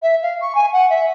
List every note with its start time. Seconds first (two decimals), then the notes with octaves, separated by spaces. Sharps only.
0.03 E5
0.22 F5
0.41 C#6
0.55 G#5
0.73 F#5
0.90 E5